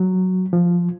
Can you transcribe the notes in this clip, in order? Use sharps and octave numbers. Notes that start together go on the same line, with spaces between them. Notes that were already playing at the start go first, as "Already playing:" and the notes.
Already playing: F#3
F3